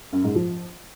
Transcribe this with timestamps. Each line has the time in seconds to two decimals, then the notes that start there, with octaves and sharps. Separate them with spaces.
0.12 F#2
0.24 G#2
0.35 F3